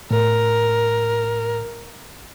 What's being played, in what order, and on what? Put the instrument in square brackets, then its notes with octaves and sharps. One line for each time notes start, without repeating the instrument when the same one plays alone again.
[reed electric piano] A2 [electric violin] A#4